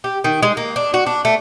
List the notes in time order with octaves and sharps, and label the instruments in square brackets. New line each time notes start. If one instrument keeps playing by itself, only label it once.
[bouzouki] G4
D#3
G#3
A#3
D4
F#4
D4
A3